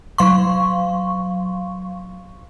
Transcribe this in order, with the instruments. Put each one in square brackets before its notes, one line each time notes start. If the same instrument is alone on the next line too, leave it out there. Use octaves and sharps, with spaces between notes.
[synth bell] F#3 F5 C6 C#6